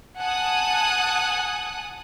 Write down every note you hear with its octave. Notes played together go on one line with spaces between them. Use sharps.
F#5 G#5 A5 D#6 F#6